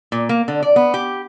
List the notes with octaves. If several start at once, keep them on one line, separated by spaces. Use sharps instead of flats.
A#2
A#3
D3
D5
B3
G4